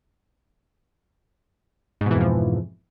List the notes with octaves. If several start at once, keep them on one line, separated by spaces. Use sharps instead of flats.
F2 G#2 B2 E3 F3